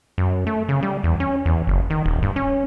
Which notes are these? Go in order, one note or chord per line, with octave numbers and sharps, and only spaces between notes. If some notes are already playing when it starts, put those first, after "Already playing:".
F#2
A3
C#3
G3
E2
C#4
E2
F#1
D#3
D#1
G2
C#4